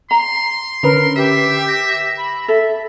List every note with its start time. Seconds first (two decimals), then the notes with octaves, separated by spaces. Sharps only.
0.11 A#5 C6
0.83 D3 C#4 A#4 B4 A#5
1.16 G4 E5
1.69 A#6
2.18 B5
2.48 A4 E5